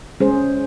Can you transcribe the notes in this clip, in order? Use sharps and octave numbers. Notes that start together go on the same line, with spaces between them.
G#3 C#4 G#4 C5